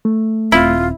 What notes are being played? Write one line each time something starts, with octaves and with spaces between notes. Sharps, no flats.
A3
D#1 C4 E4 F4